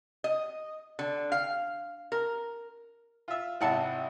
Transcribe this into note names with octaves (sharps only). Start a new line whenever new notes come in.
D#5
D3
F5
A#4
F4 E5
G#1 C3 E4 F#5 A5